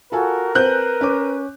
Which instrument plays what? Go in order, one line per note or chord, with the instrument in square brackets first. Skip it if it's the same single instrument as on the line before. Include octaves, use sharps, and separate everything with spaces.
[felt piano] F4 A4 G#5 [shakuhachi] F#4 [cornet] A#4
[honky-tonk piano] C4 F#6 G6 [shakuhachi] B4
[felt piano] C#4 D6